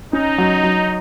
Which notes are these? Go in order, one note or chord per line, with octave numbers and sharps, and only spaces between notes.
C#4 D#4
F#3
F#3